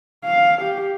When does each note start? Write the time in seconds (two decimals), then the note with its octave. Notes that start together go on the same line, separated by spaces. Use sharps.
0.25 F5
0.62 G4